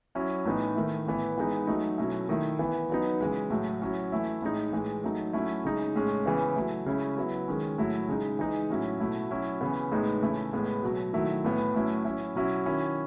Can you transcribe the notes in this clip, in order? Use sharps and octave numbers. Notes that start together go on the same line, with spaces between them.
F#3 C#4 E4
A2 E3 B3 D#4
D#3 A3 E4
A2 E3 B3 E4
E3 G#3 B3 D#4
F#3 A3 D#4
B2 F#3 A3 C#4 E4
D#3 A3 E4
E3 B3 E4
F#3 B3 D#4
C#3 E3 G#3
A2 F#3 A3
F#3 C#4 E4
E3 A3 E4
A2 G#3 D#4
A2 E3 G#3
F#3 A3 D#4
F#3 A3 C#4 E4
C#3 G#3 D#4
A2 G#3 C#4
C#3 E3 B3
F#3 A3 E4
C#3 G#3 C#4 E4
F#3 B3 E4
D#3 G#3 C#4
A2 F#3 A3 E4
C#3 G#3 D#4
E3 G#3 D#4
A2 F#3 C#4 E4
B2 A3 E4
F#3 C#4 E4
C#3 E3 B3
A2 G#3 B3 D#4
C#3 E3 A3 E4
A2 G#3 B3
B2 F#3 A3
D#3 F#3 A3 E4
A2 E3 B3 E4
A2 F#3 A3 C#4 E4
F#3 C#4 E4
B2 F#3 C#4 E4
D#3 F#3 C#4 E4